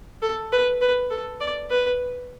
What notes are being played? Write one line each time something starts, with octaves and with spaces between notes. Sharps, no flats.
A4
B4
B4
A4
D5
B4